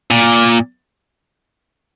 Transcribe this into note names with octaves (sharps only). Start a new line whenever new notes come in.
A#2